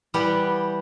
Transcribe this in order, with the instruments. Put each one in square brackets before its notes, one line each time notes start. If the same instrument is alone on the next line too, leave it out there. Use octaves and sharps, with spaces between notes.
[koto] E3 G3 B3 G4 F#5 G5